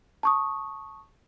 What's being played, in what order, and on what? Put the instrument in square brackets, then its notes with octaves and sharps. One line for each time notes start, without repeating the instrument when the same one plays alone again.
[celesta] A5 C#6 D#6